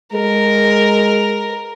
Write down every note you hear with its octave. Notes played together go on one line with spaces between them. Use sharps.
G#3 A#4